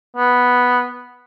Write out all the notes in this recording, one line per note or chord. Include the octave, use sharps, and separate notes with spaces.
B3